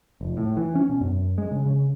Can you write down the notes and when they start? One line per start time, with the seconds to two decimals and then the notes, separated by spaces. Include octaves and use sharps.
0.21 F1
0.37 A2
0.57 E3
0.76 C#4
0.89 B2
1.01 F#2
1.38 G#3
1.51 C#3
1.66 C#3